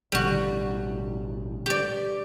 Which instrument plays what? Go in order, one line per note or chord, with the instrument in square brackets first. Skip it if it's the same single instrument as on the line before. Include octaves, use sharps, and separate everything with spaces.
[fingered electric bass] A1 B2 D3 [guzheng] G3 F#4
[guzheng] G4 D5